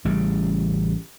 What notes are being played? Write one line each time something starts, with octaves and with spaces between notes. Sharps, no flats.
A1 A2 C#3 G3